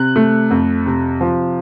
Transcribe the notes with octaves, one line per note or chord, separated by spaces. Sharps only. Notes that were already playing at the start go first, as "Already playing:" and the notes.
Already playing: C3 F#6
A3
F2
C3
F3